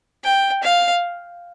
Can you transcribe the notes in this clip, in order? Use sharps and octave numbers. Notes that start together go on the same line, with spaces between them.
G5
F5